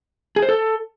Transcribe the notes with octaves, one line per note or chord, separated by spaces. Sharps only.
G#4
C5
A4